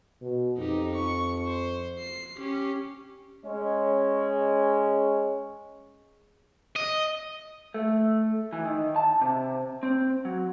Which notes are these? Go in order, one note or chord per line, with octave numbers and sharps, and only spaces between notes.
B2
F2 D#4 G4
C#6
C5
C7
C#4 G4
G#3 C#4
D#5
A3
E3
D#3
A5
C3
C4
F#3